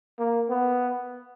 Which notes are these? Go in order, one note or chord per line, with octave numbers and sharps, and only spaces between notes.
A#3
B3